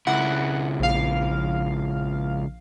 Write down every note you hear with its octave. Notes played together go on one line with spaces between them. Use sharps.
C#2 E4 F#5
A#1 F5